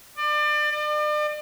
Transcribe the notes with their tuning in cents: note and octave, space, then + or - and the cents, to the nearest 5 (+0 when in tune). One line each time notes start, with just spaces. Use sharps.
D5 +30
D5 +40